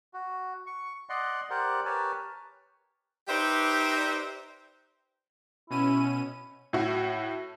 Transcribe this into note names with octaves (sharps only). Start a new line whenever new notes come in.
F#4
C#6
D5 D#5 F#5 C6
G4 A#4 C5 D5 F#5
G4 A#4 B4 C#5 G#5 A5
D#4 G4 B4 C5 D5 E5
B2 C#4 E4 D#7
A2 E4 F#4